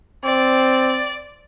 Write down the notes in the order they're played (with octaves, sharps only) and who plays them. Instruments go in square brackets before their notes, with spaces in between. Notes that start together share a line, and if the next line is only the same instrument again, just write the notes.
[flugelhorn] C4 [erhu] D5